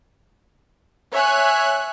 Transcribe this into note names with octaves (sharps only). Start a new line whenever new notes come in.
C#5 E5 G#5 F#6